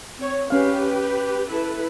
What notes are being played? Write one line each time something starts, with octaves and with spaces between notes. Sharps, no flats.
C4 C#5
C#4 G4 B4 F5
E4 A4 B4